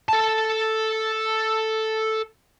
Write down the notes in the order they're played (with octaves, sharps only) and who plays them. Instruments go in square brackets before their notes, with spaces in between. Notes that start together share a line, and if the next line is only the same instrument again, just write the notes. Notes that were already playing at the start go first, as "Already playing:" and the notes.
[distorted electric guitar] A4 A5